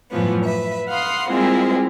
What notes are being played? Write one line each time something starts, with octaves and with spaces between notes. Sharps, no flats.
F#2 A2 E3 F3 B3
B4 E5
F5 F#5 B5 C6 D#6
G3 G#3 A#3 C4 E4 F4